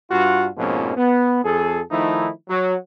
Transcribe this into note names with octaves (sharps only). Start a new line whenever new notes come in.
G2 F4 F#4
F2 G#2 B2 F3 A#3 C#4
B3
F2 G#4 A4
D#3 F3 A3 D#4 E4
F#3